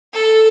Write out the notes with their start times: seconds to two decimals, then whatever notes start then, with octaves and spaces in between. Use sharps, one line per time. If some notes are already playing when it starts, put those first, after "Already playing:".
0.13 A4